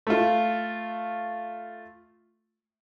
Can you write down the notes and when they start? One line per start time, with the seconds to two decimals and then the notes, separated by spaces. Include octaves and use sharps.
0.07 A3 F4